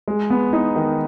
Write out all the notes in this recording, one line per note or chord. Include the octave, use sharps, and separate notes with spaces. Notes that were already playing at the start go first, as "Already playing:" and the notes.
G#3
B3
D#4
D#3